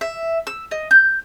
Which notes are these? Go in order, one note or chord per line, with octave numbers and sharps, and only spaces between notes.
E5
E6
D#5
G6